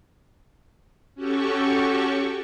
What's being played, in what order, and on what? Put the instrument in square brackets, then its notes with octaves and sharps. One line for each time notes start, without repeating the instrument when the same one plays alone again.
[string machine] C#4 F#4 G4 A4 C#6